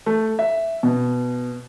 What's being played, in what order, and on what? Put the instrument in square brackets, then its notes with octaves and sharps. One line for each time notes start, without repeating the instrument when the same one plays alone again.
[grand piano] A3
E5
B2